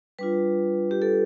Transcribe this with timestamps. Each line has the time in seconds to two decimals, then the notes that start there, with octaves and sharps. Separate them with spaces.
0.19 G3 D4 F4 B4
0.91 G4
1.02 A4